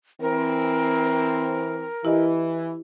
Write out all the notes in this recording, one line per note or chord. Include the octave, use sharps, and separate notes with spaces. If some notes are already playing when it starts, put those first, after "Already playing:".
E3 C4 A#4
E3 E4 G4 D#5